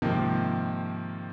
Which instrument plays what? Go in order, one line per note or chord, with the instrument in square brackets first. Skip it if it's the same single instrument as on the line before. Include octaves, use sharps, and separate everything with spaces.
[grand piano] G#2 C3 D#3 F3 A#3